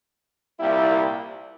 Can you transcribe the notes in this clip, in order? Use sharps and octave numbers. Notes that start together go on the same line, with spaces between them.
C2 A#2 G3 A#3 E4